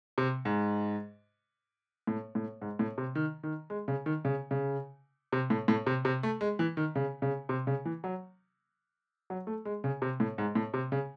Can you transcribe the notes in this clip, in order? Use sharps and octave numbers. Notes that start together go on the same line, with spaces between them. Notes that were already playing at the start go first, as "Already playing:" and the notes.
C3
G#2
A2
A2
G#2
A2
C3
D#3
D#3
G#3
C#3
D#3
C#3
C#3
C3
A2
A2
C3
C3
A3
G#3
E3
D#3
C#3
C#3
C3
C#3
E3
F#3
F#3
A3
G#3
C#3
C3
A2
G#2
A2
C3
C#3